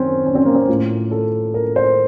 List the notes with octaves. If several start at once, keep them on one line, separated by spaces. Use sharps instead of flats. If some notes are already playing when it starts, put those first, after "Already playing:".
Already playing: F#2 D#3 C4 C#4
C#4
C4
A#3
C4
A2 F4
A4
A#4
C5